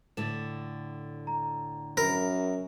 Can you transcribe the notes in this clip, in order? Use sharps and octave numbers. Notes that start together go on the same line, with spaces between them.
A2 D3 A6 E7
A#5
F#2 A#4 B5